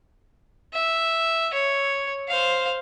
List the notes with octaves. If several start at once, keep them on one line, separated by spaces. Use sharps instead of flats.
E5
C#5
C5 F5